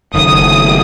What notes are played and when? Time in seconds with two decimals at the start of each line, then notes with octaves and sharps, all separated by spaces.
0.14 F#1 D#3 D#6